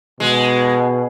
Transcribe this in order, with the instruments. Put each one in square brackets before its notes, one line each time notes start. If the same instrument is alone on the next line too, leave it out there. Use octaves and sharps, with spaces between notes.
[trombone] B2 [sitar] G#3